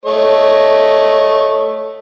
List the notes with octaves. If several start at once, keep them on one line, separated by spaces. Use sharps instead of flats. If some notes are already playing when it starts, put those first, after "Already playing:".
A3 C#5 D#5